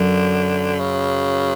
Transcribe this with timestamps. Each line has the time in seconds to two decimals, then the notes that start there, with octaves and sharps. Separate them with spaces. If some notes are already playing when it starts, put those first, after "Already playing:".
Already playing: F#2 D3 F#3
0.80 C#3